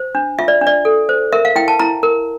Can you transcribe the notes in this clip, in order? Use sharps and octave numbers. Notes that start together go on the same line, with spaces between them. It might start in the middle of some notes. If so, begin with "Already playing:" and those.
Already playing: C5
D4
F4 E5
D5
D4
D5
A4
C5
A#4 E5
F5
E4 G5
A5
E4 A#5
A#4